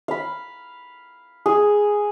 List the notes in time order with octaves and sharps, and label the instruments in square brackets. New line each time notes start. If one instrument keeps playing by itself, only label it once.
[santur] F5 B5
G#4